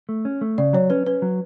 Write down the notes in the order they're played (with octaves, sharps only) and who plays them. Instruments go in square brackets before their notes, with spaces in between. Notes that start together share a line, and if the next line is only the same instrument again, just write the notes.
[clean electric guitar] A3
C#4
A3
[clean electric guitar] C#3 [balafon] D5
[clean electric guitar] F#3 [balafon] C#5
[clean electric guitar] C#4 [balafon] B4
[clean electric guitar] C#4 [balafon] B4
[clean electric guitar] F#3